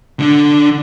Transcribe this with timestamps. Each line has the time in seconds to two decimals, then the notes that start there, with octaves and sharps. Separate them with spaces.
0.20 D3 D4